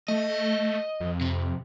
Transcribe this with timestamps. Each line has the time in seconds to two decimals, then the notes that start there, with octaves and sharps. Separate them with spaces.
0.08 A3 D#5
1.00 F2
1.21 C3